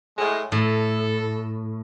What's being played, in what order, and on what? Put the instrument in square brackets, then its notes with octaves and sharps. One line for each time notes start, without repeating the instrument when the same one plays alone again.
[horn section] A2 G#3
[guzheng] A2 [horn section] A4